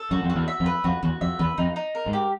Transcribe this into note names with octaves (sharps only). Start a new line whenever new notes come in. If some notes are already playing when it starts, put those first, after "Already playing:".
Already playing: A4
F#2 F#4
F2
F#4
E2
E5
F2
B4
F2 F#4
E2 F#4
F2 E5
E2 B4
F2 D#4
D#4
A#4
G#2
G4